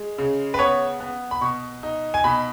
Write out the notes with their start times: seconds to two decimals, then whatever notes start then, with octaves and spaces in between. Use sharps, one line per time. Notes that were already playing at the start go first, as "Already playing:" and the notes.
Already playing: G#3
0.18 C#3
0.54 B4
0.59 B3 C#5
1.00 B3
1.31 B5
1.41 B2 C#6
1.83 D#4
2.14 G#5
2.24 B2 B5